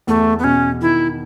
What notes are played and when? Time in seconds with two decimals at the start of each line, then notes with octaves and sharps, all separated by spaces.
0.07 E2 A3
0.39 B3
0.44 B2 C#4
0.81 D#3 E4